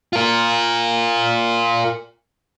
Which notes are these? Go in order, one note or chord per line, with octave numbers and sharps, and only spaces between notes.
F4 A#4